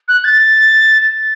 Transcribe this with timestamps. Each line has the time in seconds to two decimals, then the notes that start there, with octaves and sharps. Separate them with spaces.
0.08 F#6
0.24 A6
1.02 A6